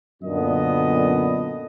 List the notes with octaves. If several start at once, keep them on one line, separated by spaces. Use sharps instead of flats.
F#2 A#2 D3 B3 D#5